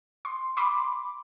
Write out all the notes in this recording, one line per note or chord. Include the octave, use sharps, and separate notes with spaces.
C6
B5 C6 D6